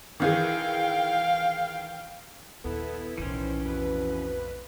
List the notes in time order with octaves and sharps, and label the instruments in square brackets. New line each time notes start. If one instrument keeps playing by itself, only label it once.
[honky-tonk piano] D#3 E3 G#4 [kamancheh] F5 G5
[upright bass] A#1 D#2 [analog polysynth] B3 E4 [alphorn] A4
[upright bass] B1 A2 [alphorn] D#3 [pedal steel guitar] E3 C#4 [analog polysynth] C5
[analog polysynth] F2 B4 [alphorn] B2